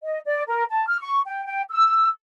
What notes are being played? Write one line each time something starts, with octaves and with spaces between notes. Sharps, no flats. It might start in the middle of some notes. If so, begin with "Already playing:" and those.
D#5
D5
A#4
A5
F6
C#6
G5
G5
E6